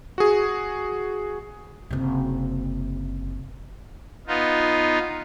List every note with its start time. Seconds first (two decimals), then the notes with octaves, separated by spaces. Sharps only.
0.18 F#4 G#4
1.91 F#1 C3
4.27 B3 D#4 F4